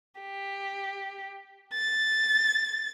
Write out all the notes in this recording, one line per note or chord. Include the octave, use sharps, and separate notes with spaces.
G4
A6